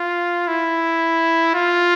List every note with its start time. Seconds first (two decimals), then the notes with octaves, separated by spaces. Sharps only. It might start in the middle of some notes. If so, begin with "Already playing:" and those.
Already playing: F4
0.48 E4
1.54 F4